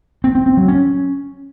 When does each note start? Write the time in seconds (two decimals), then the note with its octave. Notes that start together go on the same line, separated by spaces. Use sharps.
0.24 C4
0.35 C4
0.46 C4
0.57 F#3
0.68 C#4